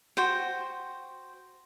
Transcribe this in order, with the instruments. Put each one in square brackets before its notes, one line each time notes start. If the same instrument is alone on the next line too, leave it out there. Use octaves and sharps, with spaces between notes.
[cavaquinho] F#4 C5 G5